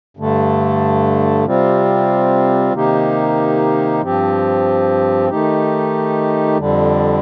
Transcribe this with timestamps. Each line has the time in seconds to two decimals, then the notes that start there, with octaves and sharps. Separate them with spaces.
0.17 G2 D3 A3
1.45 C3 G3 C4 F4
2.74 C3 D#3 A#3 D#4 G4
4.01 G2 F3 C4 G4
5.30 D#3 A3 D#4 G4
6.58 F2 D3 G3